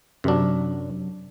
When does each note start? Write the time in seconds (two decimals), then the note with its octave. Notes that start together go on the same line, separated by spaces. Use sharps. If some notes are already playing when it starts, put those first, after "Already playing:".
0.24 F#2 C3 F#3 D4